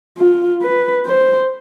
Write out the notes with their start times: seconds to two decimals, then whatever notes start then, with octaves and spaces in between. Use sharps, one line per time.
0.18 F4
0.62 B4
1.06 C5